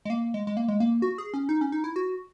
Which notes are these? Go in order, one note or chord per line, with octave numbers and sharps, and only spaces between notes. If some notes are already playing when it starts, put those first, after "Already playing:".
G#3
A#3
G#3
G#3
A#3
G#3
A#3
F#4
G#4
C#4
D#4
C#4
D#4
E4
F#4